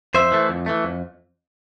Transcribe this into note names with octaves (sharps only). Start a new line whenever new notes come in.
F2 C5 E5
E3 A3
F2
E3 A3
F2